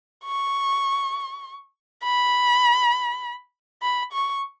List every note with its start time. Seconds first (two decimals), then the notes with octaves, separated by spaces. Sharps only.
0.25 C#6
2.04 B5
3.82 B5
4.13 C#6